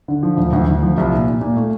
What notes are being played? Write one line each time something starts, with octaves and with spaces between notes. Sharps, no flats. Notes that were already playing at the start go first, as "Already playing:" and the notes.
D3
F3
D2
D2
D2
F3
C2
A#2
A#2
A#2
A3